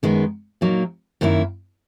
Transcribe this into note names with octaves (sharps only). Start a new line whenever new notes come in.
F#2 D#3 G#3 B3
A#2 F#3 A#3 D#4
F#2 D#3 A#3 E4